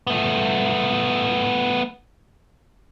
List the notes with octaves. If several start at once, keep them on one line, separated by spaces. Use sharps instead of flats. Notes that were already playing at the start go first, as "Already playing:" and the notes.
A3 B3